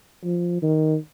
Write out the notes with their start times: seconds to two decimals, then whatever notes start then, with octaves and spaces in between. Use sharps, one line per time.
0.25 F3
0.62 D#3